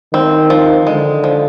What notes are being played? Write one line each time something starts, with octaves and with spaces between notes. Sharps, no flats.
D#3 C4
F3
D3 G#3
F3